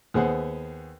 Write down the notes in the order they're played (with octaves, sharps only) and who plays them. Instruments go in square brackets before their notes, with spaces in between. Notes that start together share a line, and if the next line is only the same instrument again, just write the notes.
[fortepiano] D#2 B3 G#4 C5 F#5